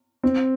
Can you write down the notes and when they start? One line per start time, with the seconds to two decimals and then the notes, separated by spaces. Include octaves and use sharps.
0.23 C4